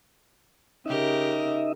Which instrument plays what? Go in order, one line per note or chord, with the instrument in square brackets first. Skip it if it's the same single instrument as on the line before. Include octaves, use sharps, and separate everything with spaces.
[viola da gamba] C#3 G4 A#4 [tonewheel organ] D#4 D#5 E5